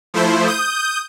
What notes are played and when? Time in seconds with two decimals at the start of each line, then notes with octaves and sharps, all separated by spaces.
0.14 F3 A3 E4 C5
0.47 D#6 G6